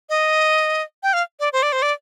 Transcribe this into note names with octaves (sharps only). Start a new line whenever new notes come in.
D#5
G5
F5
D5
C5
D5
C5
D5